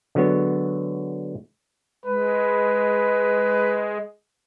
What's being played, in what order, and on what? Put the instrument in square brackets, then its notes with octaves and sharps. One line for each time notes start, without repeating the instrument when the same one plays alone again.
[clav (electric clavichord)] D3 F#3 G#3 B3 C#5
[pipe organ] G#3 [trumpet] B4